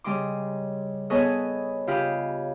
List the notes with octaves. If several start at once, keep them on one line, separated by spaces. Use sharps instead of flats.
C#3 G3 D#5 C6 D6
B3 G#4 A4 B4 C#5 D#5
C#3 F4 G4 D#5 B5 F6